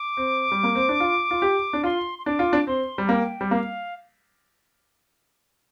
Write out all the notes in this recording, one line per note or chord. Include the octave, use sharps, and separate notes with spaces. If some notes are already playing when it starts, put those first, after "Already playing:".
Already playing: D6
C4
G3
A#3
C4
D4
F4
F4
G4
D4
F4 C6
C6
D4 D6
F4
D4
C4 C6
G3
A#5
A#3 G5
G3
A#3 F5